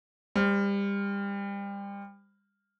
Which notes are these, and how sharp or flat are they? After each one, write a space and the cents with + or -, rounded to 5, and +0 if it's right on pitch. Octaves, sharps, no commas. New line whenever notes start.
G3 +30 C5 +0